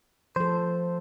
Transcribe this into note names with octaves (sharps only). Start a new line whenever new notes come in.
F3 A4 C5